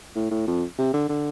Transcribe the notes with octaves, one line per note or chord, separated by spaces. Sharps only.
A2
A2
F2
C3
D3
D3